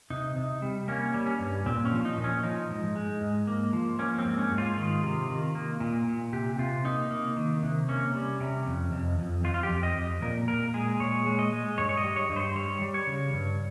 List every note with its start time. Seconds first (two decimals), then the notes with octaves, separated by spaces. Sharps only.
0.10 C3 D#4
0.36 C3
0.62 G3
0.88 A#3 C#4
1.14 G3
1.26 C#4
1.40 G2
1.66 A#2 C4
1.85 C#4
1.92 F3
2.05 D#4
2.18 A#2
2.24 C#4
2.43 F3 D#4
2.70 G#2
2.96 G#3
3.21 G#2
3.47 A#3
3.73 F3
3.99 A#3 C#4
4.19 C4
4.25 G#2
4.38 C#4
4.52 G#2
4.58 F4
4.77 D#3
5.03 C3
5.29 D#3
5.55 A#3
5.80 A#2
6.07 A#2
6.33 C3 G4
6.59 C3 F4
6.85 A#3 D#4
7.11 A#3
7.36 D#3
7.63 C3
7.88 A#3 C#4
8.15 G3
8.40 C3
8.66 F2
8.92 F2
9.19 F2
9.44 F2 F4
9.54 F4
9.63 G4
9.70 F2
9.83 D#5
9.96 F2
10.22 A#2 A#4
10.48 A#2 A#4
10.74 G#3 G#4
11.00 A#2 C#5
11.26 G#3
11.39 D#5
11.52 G#3
11.78 G2 C#5
11.89 C#5
11.97 D#5
12.04 G3
12.16 C#5
12.29 G2
12.36 C5
12.55 G3 C#5
12.82 G3
12.94 C#5
13.07 C#3
13.33 G2